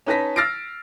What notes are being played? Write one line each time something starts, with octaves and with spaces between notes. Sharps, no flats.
C#4 D#4 B4 A5 A#6 B6
E6 F6 A6 A#6 C7 D7